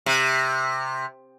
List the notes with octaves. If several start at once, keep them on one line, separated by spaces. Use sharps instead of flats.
C3